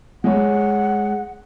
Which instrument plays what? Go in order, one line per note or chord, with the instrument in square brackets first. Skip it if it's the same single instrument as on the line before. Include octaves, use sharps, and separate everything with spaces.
[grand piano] G#3 C#5 [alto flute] F#5